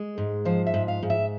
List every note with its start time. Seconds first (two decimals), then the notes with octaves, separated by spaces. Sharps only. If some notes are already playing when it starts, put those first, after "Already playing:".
Already playing: G#3
0.18 G#2
0.45 F3 C5
0.67 E5
0.74 G#2
0.88 F5
1.03 G#2
1.10 E5